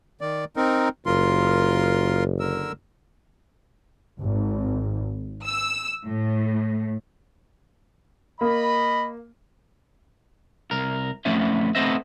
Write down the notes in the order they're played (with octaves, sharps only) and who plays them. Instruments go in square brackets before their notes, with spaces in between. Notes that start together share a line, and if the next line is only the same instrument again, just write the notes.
[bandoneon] D#3 D5
C4 D#4 A#4
[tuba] F#1 [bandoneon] F4 A#4 C6
[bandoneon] D3 A#4 E6
[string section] G#1
E6
A2
[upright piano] A#3 [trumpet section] D#5 B5
[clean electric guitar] C2 A#4
F2 A3 B3 C#4 C5 E5
A3 B3 C4 C5 D#5 E5